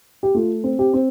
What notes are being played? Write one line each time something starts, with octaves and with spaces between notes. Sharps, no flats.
G4
A3 F4
C4
G4
C4